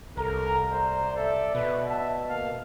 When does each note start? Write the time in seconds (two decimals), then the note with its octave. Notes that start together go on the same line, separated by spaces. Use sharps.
0.17 C2 A4 A#4 A#5
0.72 C5 D5
1.16 A4 E5
1.55 B2 B4
1.88 E5 A5
2.29 A#3 F5